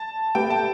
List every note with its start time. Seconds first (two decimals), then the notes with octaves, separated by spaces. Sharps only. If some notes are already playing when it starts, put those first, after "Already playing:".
Already playing: A5
0.35 A3 G4 B4 G5
0.50 A5